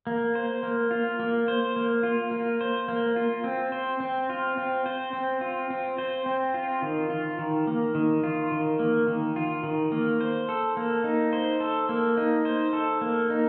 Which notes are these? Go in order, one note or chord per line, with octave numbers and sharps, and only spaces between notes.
A#3
C5
A#3
F4
A#3
C5
A#3
F4
A#3
C5
A#3
F4
C4
C5
C4
F4
C4
C5
C4
F4
C4
C5
C4
F4
D#3
F4
D#3
A#3
D#3
F4
D#3
A#3
D#3
F4
D#3
A#3
C5
A4
A#3
D#4
C5
A4
A#3
D#4
C5
A4
A#3
D#4